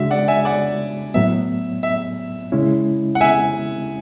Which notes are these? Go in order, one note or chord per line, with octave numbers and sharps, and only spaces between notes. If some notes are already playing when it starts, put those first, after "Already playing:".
Already playing: C#3 G#3 D4 F#4 E5
D5 F#5
E5 G#5
D5 F#5
A2 F#3 B3 E5
E5
C#3 G#3 C#4 E4
F#5
E5 G#5